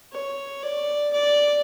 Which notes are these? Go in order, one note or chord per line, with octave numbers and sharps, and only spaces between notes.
C#5
D5
D5